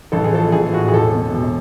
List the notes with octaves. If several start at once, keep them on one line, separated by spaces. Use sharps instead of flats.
A1 A4
G#4
F3 A4
A1 G#4
A2 F#4
G#4
E1 A4
B2
E1